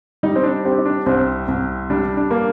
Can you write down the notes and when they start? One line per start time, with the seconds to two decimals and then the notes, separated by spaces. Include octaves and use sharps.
0.23 G3 D#4
0.36 C4
0.43 D4
0.65 C4 G4
0.78 D#4
0.85 D4
1.06 C2 C4
1.48 C2
1.90 G3 D4
2.17 D4
2.31 A#3